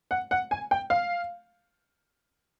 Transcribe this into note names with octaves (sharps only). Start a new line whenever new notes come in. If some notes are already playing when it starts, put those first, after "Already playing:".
F#5
F#5
G#5
G5
F5